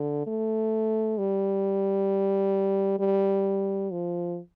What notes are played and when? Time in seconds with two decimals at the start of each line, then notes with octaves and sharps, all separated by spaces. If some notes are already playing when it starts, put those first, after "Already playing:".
Already playing: D3
0.27 A3
1.18 G3
2.99 G3
3.91 F3